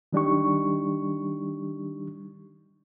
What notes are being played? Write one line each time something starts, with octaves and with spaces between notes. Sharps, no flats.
D#3 G3 D4 D#4 G4 C#6